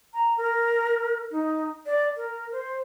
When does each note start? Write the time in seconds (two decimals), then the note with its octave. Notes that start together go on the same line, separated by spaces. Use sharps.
0.14 A#5
0.38 A#4
1.31 D#4
1.86 D5
2.16 A#4
2.52 C5